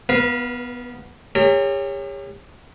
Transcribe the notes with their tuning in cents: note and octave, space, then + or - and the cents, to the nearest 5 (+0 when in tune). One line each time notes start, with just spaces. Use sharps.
B3 +0 B4 -40 F5 +0
G4 +45 A#4 -45 C#5 +0